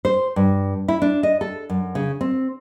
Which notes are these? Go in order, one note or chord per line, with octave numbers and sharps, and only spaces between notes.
C5
G2
E4
D4
D#5
A4
F#2
C#3
C4